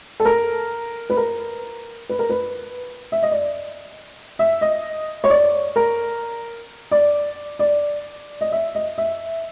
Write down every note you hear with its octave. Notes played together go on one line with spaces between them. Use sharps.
A4
A#4
B4
A#4
B4
A#4
B4
E5
D#5
D5
E5
D#5
C#5
D5
A#4
D5
D5
D#5
E5
D#5
E5